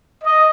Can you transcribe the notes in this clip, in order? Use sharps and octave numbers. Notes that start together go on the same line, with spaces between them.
D#5